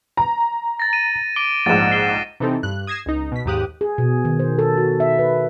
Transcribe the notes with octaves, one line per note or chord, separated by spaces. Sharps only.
A#5
A6 A#6
D#7
D6 D7 G7
A#1 G#2 A6 E7
C7 G7
C3 E3 C4 D#4 A4
G2 F#6
D#6 G#6 A#6 C7 E7
C#2 D#4
B2 B6
D#2 G#2 G4 D#6 F#6
G#4
B2
D#3
C5
A4
F#4
E5
B4